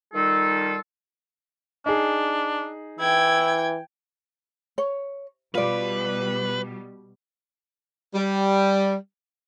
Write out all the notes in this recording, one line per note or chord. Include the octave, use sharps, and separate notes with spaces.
D#3 G3 D#4 F4 A4
D4 D#4 G#4
E3 E4 G5 G#6
C#5
B2 G3 F4 B4 D5
G3